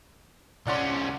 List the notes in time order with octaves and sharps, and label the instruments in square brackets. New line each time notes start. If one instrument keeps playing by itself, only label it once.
[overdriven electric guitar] C2 C#4 [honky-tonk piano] D5 F#5 C6